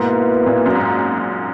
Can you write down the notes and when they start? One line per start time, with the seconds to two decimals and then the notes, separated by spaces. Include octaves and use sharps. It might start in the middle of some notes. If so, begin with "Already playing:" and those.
Already playing: G#2 B2 A#3 E4 B4
0.46 A#2
0.66 F#2
0.75 G#2